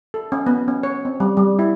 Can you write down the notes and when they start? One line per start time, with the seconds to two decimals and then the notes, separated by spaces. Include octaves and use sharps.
0.14 A4
0.32 C#4
0.47 B3
0.68 C#4
0.83 C#5
1.05 C4
1.20 G3
1.37 G3
1.59 E4